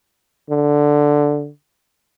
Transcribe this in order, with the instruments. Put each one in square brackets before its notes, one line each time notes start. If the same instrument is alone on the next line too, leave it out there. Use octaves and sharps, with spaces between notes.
[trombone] D3